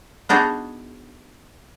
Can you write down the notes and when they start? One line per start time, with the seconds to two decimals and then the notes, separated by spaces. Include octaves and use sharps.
0.29 B3 D4 D#4 F#4 G#4